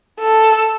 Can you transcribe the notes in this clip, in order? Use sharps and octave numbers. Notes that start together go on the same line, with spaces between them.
A4